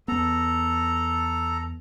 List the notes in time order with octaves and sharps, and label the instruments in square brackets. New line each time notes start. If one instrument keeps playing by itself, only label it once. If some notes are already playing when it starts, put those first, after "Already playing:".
[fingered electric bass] E2 B3 [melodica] A4 A#5